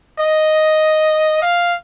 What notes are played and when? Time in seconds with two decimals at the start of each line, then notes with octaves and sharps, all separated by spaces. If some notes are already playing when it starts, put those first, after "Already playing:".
0.19 D#5
1.42 F5